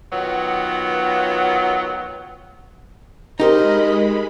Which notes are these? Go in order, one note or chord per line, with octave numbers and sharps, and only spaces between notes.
D#3 F#3 B3 F4
G#3 D#4 G4 A#4 C5 D#5 B5